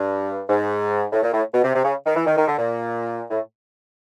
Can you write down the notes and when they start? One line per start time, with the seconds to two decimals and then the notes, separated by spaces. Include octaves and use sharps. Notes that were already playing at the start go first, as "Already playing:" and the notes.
Already playing: G2
0.49 G#2
1.12 A2
1.22 A#2
1.33 A2
1.54 B2
1.64 C3
1.75 C3
1.84 C#3
2.06 D#3
2.16 E3
2.26 D#3
2.37 D#3
2.47 D3
2.58 A#2
3.30 A2